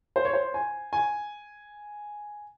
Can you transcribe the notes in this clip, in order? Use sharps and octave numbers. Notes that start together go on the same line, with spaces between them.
C5
C#5
C5
G#5
G#5